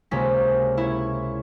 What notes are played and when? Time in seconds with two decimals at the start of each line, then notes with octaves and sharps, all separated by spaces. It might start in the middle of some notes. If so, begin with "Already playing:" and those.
0.11 C#2 C3 A#3 C#4 B6
0.77 E4 C#5